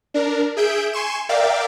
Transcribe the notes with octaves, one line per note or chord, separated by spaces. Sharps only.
D4 A#4
G#4 E5 G6 D7
G#5 C6 C#6 E7
A#4 D5 E5 F5 G5 D6